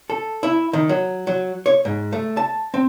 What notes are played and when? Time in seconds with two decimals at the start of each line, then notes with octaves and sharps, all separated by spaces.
0.10 A4
0.43 E4
0.73 D#3
0.89 F#3
1.27 F#3
1.66 C#5
1.85 G#2
2.13 A3
2.37 A5
2.74 C4